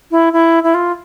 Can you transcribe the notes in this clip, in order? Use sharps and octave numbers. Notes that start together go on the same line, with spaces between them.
E4
E4
E4
F4